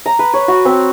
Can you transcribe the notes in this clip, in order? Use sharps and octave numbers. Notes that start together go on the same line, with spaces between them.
A#5
B4
C#5
F#4
C4